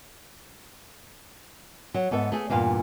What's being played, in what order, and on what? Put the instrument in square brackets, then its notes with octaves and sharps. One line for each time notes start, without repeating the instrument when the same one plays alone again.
[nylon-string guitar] F#3
G#2 B3 A4 E5
A3 G#4
E2 G2 A#2 F5